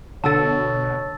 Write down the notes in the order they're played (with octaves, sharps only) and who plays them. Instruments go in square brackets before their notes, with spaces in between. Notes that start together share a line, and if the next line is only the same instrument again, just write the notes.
[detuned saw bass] B2 [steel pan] D3 A4 [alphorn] C#5 [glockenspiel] A5 E6 A6